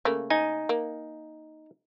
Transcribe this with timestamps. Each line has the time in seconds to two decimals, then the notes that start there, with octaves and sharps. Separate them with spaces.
0.05 C#3 A3 A#3
0.30 D#4 G#5
0.69 A#3